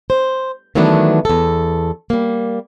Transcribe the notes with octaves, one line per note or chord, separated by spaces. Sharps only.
C5
D#3 E3 F#3 A3 B3 D4
E2 A4
G3 A#3